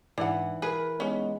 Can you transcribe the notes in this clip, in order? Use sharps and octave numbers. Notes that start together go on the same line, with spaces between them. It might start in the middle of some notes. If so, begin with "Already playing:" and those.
G#2 E3 D4 F#5
G#4 A#4 B4
G#3 B3 C#4 D#4